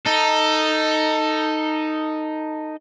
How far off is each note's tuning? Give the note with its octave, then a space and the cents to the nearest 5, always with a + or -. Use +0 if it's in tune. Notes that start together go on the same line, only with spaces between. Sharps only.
D#4 +0 A4 +15